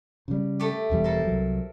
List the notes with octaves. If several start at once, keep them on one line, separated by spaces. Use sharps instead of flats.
C#3 G3
A3 G4
E1 E2 G3
A4 A#4 C5
C2 F#3